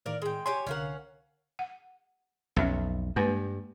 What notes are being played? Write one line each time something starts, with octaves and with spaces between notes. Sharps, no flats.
A2 D#3 A#4 D5 F5
G#3 G5
G4 C#5 G#5 C6
C2 D3 C#4 A#4 F5 F#5
F#5
B1 F2 C#4 E5
G2 G#3 A#3 B4